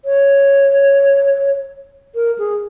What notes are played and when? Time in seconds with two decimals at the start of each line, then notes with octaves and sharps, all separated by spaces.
0.05 C#5
2.15 A#4
2.38 G#4